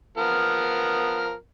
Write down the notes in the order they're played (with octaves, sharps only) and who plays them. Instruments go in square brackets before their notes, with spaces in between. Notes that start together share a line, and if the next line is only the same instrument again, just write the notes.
[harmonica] F3 B3 A#4